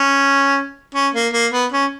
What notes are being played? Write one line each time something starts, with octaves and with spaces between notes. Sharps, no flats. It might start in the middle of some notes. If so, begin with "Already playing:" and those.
Already playing: C#4
C#4
A#3
A#3
B3
C#4